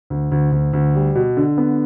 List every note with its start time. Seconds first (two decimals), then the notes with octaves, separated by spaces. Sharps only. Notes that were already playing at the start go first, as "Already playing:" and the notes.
0.10 D2
0.31 D2
0.52 D2
0.73 D2
0.95 G3
1.15 B2
1.37 D3
1.58 B3